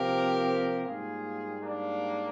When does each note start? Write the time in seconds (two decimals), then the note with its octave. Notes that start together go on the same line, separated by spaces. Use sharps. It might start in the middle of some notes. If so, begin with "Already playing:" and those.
Already playing: C3 F3 A#3 G4 A#4
0.85 G#2 G3 A#3 F4 G#4
1.62 A#3 D4